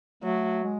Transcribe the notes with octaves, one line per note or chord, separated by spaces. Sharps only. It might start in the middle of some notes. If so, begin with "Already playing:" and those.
F#3 A3
G#3